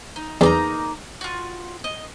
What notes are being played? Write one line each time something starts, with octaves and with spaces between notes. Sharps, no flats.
D#4
E2 A#3 D#4 A#5
F4 F#4
D#5